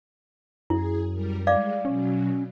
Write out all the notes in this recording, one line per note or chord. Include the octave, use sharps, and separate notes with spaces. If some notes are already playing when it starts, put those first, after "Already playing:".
F#2 E4 G#4
G3 A#4
G3 G#3 D5 F5 D6
B2 F#3 C#4